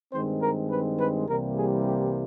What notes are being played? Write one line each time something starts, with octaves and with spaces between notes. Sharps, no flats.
G2 D#3 G#3 C4 C5
A#4
B4
B4
C2 C3 E3 G3 A#3 A#4
G#4
G4